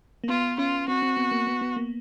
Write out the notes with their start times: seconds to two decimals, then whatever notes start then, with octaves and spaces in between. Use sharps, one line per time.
0.24 A#3
0.29 B3 F4
0.58 C#4 F4
0.88 C4 F#4
1.02 C4
1.17 B3
1.31 A#3
1.47 B3
1.61 B3
1.76 A#3